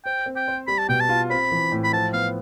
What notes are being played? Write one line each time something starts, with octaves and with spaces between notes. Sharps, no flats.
C5 G5
C4
G5
C5
G3 B5
A5
B2 G5
A5
F4
C4 B5
E3
A2
B5
F3 A5
B3 F5